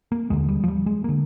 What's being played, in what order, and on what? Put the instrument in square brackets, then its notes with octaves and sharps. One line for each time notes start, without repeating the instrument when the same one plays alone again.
[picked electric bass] A#3
D#2 D3 G#3
G3
F3
G3
G#3
D3 A#3